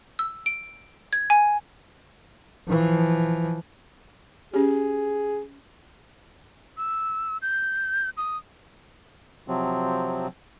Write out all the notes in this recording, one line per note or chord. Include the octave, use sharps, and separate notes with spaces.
E6
D7
G#6
G#5
E3 F3
C#4 G4 G#4
E6
G6
D#6
C3 F3 F#3 C4